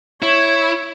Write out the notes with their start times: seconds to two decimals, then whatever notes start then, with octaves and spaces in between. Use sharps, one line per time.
0.22 E4 C#5